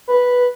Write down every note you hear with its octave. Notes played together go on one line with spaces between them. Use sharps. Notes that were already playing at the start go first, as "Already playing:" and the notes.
B4